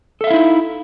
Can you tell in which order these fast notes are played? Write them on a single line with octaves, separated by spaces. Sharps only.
A4 E5 F5 E4 D#4